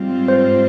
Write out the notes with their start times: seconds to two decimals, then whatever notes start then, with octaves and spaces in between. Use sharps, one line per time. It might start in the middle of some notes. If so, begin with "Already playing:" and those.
Already playing: G#2 G3 C4 F4
0.28 C5